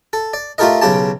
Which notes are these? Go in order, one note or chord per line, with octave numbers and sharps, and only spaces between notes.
A4
D5
A3 F4 G4 A4 A#4 D#5
B1 C#3 G4 A5